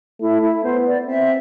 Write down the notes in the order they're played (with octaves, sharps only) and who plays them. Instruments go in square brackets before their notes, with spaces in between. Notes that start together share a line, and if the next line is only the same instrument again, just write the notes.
[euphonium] A3 [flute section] E4
[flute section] E4
[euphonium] B3 [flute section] C5
[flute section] D5
[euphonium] C4 [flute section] E5